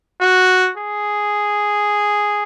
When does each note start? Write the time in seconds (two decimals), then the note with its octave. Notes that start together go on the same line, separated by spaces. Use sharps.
0.21 F#4
0.77 G#4